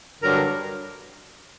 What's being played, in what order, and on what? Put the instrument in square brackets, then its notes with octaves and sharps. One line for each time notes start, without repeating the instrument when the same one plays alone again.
[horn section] G2 D3 F#3 A#4